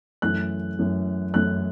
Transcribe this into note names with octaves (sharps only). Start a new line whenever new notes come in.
F#2 E3 A3 F#6
F#2 E3 A3
F#2 E3 A3 F#6